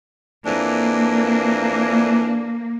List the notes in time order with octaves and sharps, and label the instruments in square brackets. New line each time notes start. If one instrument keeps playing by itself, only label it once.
[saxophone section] F2 E3 D4 [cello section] A#3